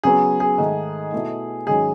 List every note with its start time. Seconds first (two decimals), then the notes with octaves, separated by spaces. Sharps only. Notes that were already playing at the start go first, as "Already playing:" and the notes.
0.03 C#3 F#3 B3 G#4
0.40 G#4
0.58 G#2 D#3 A3 D#4
1.12 B2 A3 E4
1.67 G#2 D#3 F#3 C#4 G#4